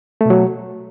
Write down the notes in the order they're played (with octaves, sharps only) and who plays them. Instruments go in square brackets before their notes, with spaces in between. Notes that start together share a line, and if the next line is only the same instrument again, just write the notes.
[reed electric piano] A3
B2
F#3